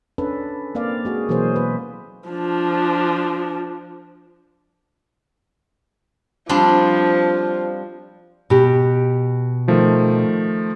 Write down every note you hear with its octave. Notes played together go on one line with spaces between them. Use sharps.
C#4 D4 A4 B4
A#3 C4 D5 F5
G#3 F#4 G#4
B2 E3 F#3 A#3 G#4 C5
B4
F3 D4
F3 G3 C4 D4
B2 G4
D#3 F3 A3